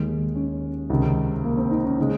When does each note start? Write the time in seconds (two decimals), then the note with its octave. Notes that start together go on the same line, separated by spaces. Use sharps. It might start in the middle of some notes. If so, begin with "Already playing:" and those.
Already playing: D#2 D#3 G#3 D#4
0.35 C#4
0.90 C#2 C3 D#3
1.44 A#3
1.57 C4
1.71 D#4
1.84 C#4
1.98 C#3 G#3 D#4